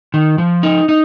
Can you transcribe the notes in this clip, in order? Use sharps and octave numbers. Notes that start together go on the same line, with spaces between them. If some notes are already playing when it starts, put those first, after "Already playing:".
D#3
F3
D#4
D#4